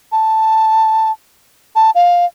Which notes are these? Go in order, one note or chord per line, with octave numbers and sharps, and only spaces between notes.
A5
A5
F5